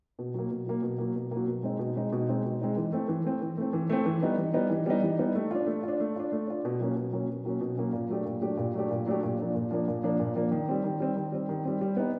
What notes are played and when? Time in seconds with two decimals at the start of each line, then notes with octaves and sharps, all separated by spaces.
0.19 B2
0.34 F#3 A#3
0.51 B2
0.66 F#3 A#3
0.82 B2
0.98 F#3 A#3
1.16 B2
1.31 F#3 A#3
1.47 B2
1.63 G#3 C4 D#4
1.79 B2
1.96 G#3 C4 D#4
2.12 B2
2.28 G#3 C4 D#4
2.45 B2
2.61 G#3 C4 D#4
2.77 E3
2.92 A3 C4
3.08 E3
3.25 A3 C4
3.42 E3
3.57 A3 C4
3.73 E3
3.90 A3 C4
4.06 E3
4.23 G3 B3 D#4
4.37 E3
4.54 G3 B3 D#4
4.70 E3
4.86 G3 B3 D#4
5.03 E3
5.19 G3 B3 D#4
5.35 A3
5.51 D4 F4
5.67 A3
5.83 D4 F4
6.00 A3
6.16 D4 F4
6.32 A3
6.47 D4 F4
6.65 B2
6.80 F#3 A#3 C#4
6.96 B2
7.13 F#3 A#3 C#4
7.29 B2
7.45 F#3 A#3 C#4
7.61 B2
7.77 F#3 A#3 C#4
7.93 A#2
8.09 F#3 A3 D4 G4
8.26 A#2
8.41 F#3 A3 D4 G4
8.57 A#2
8.74 F#3 A3 D4 G4
8.91 A#2
9.06 F#3 A3 D4 G4
9.23 A#2
9.38 F3 A#3 D4
9.55 A#2
9.71 F3 A#3 D4
9.88 A#2
10.03 F3 A#3 D4
10.20 A#2
10.35 F3 A#3 D4
10.51 D#3
10.68 G3 C4
10.84 D#3
11.00 G3 C4
11.16 D#3
11.32 G3 C4
11.49 D#3
11.65 G3 C4
11.81 G3
11.96 B3 D#4